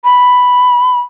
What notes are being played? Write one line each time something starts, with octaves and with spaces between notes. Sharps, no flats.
B5